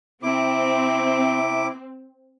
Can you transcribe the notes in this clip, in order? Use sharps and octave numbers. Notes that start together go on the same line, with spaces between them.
C3 C4 E4 D6